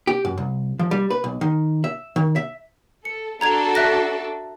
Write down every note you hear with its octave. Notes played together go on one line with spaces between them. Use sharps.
G4
F#2
C2
F3
G3
B4
B1
D#3
E5
D#3
E5
A4 C#7
D4 F#4 A4 A#5 G#6 F7
E5 F#6 A#6